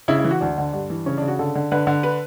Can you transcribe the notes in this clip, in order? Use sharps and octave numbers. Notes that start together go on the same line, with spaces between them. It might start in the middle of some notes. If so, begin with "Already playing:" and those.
C#3 E4
E3 E4
F#4
D2 D4
D3
G2
E3
C#3 C#4
C#3 D4
F#4
D3 A4
D3
D3 B4
D3
B4